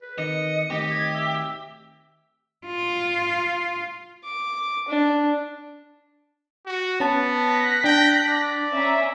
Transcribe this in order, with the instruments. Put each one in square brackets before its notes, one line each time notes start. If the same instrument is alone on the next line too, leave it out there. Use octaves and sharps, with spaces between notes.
[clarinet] B4
[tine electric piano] D#3 C4 [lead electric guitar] D#5 [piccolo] C#7
[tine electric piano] D#3 A3 C4 [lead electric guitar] G4 [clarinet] D#5
[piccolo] G#6
[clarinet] E5 [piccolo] E6
[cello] F4
[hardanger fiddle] D6
D4
[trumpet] F#4
[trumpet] B3 [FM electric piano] C#4 A5
[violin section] F#6 A#6 B6
[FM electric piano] D4 A5 [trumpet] G5
[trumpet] D5
[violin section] C#4 E5 A#5